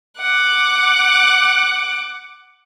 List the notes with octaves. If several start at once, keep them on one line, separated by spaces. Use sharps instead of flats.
F#5 D6